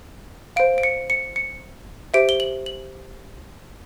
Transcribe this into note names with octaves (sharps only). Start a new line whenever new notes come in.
C5 F5 D7
D7
C#7
C#7
C#7
G4 C5 E5 D7
G7
F#7
F#7